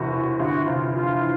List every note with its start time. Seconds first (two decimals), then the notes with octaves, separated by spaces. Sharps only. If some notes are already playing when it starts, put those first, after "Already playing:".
Already playing: E1 E2 C3 F#4
0.12 E3
0.39 G1 F#4
0.66 C3 F4
0.93 F2 F4
1.20 E3